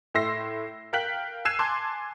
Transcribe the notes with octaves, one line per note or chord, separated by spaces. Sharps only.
A2 E4 C6 E6 A#6 C7
A#4 F5 G5 F#6 B6 F#7
E6 F#6 G#6 C7 D#7 E7
G#5 A5 C6 D6 E6 F#6